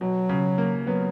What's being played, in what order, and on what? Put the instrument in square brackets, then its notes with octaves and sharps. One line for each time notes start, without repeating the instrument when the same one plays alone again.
[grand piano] B2 [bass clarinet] F#3
[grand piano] C#3
A#3
[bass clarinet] F#3 [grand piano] B3